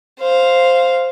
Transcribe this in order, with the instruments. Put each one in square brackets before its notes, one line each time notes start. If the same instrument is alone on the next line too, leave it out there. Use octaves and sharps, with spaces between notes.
[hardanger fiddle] C5 F5